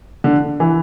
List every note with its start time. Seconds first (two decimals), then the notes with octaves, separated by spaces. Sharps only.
0.24 D3
0.60 E3